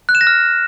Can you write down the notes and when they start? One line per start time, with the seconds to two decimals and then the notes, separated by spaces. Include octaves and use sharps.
0.09 F#6
0.15 E7
0.21 A#6
0.27 F6